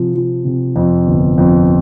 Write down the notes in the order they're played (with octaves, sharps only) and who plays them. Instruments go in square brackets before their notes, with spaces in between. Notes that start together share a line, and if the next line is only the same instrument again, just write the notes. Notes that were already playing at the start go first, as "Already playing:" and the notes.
Already playing: [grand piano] C3 F3
F3
C3
F2
G1
F2